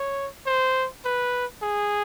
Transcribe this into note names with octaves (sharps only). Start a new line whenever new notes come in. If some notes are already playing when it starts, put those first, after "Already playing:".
Already playing: C#5
C5
B4
G#4